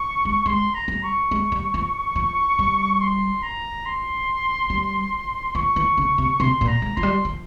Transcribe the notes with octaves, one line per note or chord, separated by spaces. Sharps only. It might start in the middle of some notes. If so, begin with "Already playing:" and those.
Already playing: C#6
G#3
G#3 C6
A#5
G3
C#6
G#3
G3
F3
F3
G3
C6
A#5
C6
G3
F3 C#6
E3
C#3
C3
C3 C6
A#2
A#5
G#3
F3 C6
G3
F3